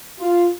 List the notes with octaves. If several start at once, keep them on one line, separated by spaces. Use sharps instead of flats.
F4